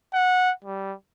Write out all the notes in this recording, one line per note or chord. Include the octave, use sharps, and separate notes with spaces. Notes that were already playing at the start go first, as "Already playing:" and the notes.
F#5
G3